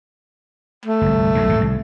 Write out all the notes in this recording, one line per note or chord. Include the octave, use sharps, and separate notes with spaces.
A3
G1 C2
B1 F#2 C3
G#1 F2 A#2
C2